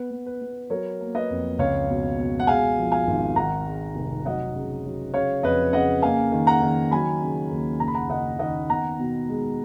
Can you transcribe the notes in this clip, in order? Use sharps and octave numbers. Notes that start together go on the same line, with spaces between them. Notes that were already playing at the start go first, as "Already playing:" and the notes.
Already playing: B3 B4
B3
B4
B3
F#3 A#4 C#5
A#3
B4 D#5
F2
C#2 C#5 F5
B2
B2
F#5
G#3 F5 G#5
F3
F5 G#5
G#1
D#3 F#5 A#5
G#3
F1
F#3 D#5 F#5
C#3
F#3
C#3 C#5 F5
F2 B4 D#5
C#3 D#5 F#5
A#3 F5 G#5
D#3
F#5 A#5
D#3
F#3 G#5 B5
C#3
D#2
F#1 A#5
B5
F#5 A#5
F#1 D#5 F#5
D#3 D#5 F#5
B3 F#5 A#5
B2
G#3